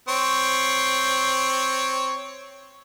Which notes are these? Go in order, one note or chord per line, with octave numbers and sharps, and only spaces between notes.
C4 C#5